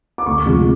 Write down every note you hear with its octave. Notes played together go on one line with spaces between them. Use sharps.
D6
D2 C#6
C3 F3 G#3